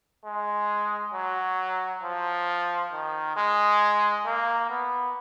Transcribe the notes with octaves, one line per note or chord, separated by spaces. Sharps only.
G#3
F#3
F3
D#3
G#3
A#3
B3